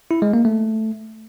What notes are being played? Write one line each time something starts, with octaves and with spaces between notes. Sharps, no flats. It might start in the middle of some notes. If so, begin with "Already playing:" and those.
E4
G#3
A#3
A3